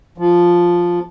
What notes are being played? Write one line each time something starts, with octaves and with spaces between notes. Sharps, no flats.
F3